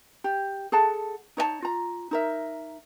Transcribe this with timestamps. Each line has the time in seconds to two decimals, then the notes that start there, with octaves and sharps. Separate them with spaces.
0.24 G4
0.72 G#4 A4 F#5 A5
1.37 D#4 C#5 D#5 A5
1.62 F4 A#5
2.11 D#4 A#4 E5